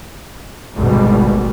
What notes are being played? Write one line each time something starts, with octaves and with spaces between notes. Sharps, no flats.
G#1 D2 B2 G3